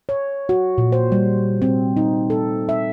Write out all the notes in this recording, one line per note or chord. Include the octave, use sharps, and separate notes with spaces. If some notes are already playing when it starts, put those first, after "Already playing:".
C#5
F#4
A#2
C5
G3
C4
D#4
A4
E5